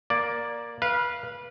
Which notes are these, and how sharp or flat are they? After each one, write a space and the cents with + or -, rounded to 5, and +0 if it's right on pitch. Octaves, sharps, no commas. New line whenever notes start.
A#3 +10 D5 +0
B4 -25 F5 +0